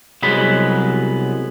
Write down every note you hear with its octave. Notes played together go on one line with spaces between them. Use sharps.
C2 F#3 G#3 B3 B5